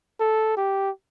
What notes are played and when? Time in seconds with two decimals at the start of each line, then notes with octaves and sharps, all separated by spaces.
0.20 A4
0.57 G4